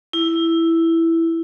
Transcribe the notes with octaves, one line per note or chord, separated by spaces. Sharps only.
E4